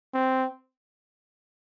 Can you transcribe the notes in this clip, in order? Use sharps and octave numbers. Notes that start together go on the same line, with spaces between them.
C4